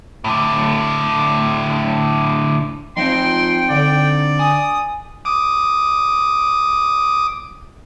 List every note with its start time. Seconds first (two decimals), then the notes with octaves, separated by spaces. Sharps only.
0.24 A2 D3
2.97 F3 C4 D#4 G5 C6
3.70 D3 D5
4.39 G#5 D#6
5.25 D6 D#6